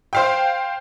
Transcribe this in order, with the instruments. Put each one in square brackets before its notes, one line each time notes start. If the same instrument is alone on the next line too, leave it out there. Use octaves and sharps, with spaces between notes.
[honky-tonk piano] C5 F5 G5